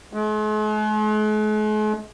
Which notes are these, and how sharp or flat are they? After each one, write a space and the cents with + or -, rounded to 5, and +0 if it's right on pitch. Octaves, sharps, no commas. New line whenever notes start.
G#3 +45